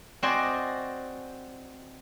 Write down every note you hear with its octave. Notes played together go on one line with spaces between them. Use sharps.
C4 F#4 C5 D5 D#5 G#5